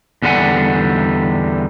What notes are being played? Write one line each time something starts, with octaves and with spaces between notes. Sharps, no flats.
E2 D3 G3 B4 F#5 G#5